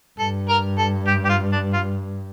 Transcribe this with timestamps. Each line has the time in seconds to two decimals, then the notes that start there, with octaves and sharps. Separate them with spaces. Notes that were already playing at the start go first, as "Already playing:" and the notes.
0.19 G2 A4
0.49 A#4
0.78 A4
1.07 G4
1.25 G4
1.29 F4
1.52 D4
1.73 F4